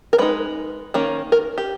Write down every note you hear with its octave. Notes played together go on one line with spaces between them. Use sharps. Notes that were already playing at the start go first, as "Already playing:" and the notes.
A#4
G#3 D#4 B4
D#3 A#3 C#4
A#4
G4